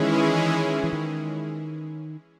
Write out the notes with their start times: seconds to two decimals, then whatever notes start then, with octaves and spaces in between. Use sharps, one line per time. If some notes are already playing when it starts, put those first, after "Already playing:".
Already playing: D#3 E3 G#3 C#4 E4 G#4
0.84 E3
0.93 D#3